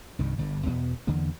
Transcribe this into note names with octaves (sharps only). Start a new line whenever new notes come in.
C2 G2 D#3
G1 G2
E2 B2 B3
E2 D3 E3 A#3